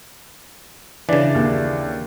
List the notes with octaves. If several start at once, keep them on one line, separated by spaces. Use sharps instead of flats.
C#3 E3 D4
D#2